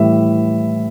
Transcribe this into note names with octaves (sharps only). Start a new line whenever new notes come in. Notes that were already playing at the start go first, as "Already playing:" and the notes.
Already playing: A2 E3 G3 E5